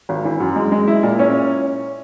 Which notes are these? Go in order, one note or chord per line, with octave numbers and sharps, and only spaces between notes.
G#1
E3
F#2
G#3
G#3
E4
A#2
C#4